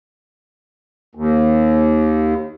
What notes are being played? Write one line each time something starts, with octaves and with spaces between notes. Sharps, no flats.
D#2